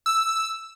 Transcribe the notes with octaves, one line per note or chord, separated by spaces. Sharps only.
E6